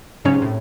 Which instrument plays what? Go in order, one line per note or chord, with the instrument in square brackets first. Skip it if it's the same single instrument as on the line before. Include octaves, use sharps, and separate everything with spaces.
[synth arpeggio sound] G#2 F#3 C#4 G#4 C#5 [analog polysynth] C#3
[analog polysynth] C3
A2